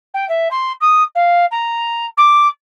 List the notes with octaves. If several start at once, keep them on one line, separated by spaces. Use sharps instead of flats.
G5
E5
C6
D#6
F5
A#5
D6